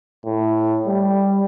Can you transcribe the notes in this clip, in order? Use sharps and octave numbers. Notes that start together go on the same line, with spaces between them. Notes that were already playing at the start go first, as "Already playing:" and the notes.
A2
G3